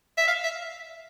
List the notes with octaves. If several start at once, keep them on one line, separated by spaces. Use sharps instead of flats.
E5
F5
E5